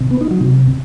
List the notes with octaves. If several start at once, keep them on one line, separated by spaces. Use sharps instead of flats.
C3
B3
D#4
F#3
C3